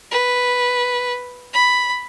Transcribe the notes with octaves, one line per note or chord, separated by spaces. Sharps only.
B4
B5